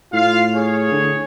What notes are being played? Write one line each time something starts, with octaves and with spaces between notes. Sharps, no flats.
A2 F4 F5
G#4 C#5
D3